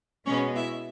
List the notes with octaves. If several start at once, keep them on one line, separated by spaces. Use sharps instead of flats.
B2 G#3 B3 C#4 C#5
E4 E5